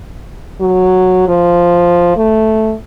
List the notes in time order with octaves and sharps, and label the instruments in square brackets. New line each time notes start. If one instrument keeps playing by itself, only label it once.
[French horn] F#3
F3
A3